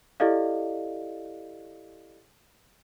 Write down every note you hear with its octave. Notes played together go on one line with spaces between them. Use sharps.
E4 G4 A4 D5 D#5 F5